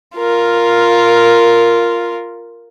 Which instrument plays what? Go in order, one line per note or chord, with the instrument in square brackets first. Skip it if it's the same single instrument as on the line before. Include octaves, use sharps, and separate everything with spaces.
[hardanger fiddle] F4 A#4